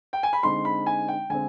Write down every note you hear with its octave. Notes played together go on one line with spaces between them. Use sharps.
G5
G#5
B5
D3 G#3 C4 D#4 C6
B5
G#5
G5
D3 G#3 C4 G#5